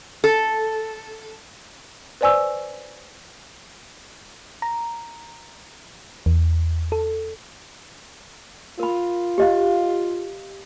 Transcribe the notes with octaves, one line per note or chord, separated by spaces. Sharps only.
A4
B4 C5 D5 G#5 C#6 E6
A#5
E2
A4
F4 A#4 B5
G4 D#5 F5